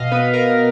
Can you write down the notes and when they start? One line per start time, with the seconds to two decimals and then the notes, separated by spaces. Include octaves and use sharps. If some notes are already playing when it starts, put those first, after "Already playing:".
Already playing: B2 D#5 F5
0.11 B3 B4
0.33 A#4